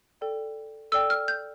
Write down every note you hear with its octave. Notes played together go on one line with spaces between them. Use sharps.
A4 D5 G5
A4 D5 G5 E6
F6
G6